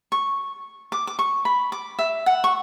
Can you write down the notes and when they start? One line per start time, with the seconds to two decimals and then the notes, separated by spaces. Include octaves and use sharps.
0.12 C#6
0.92 D6
1.07 D6
1.19 C#6
1.45 B5
1.72 D6
1.99 E5
2.26 F#5
2.44 C#6